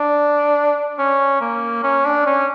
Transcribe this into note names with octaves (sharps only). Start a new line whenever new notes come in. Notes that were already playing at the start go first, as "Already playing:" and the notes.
Already playing: D4
C#4
A#3
C#4
D4
C#4